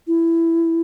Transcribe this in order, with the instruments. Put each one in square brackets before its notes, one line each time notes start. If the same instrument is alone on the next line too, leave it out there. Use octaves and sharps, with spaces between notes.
[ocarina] E4